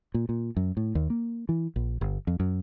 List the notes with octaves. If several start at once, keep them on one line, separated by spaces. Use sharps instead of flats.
A#2
A#2
F#2
A2
D#2
A#3
E3
A#1
G1
F2
F#2